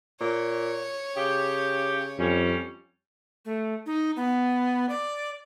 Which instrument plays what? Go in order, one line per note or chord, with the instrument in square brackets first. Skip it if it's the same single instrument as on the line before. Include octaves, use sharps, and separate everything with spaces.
[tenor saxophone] A#2 [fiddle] C#5
[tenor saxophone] C#3 [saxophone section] G4
[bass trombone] F2 [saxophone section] G3 C#4
[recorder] A3
D#4
B3
D5